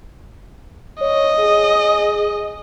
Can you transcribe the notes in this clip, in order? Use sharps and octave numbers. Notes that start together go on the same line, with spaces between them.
C#5 D#5
G#4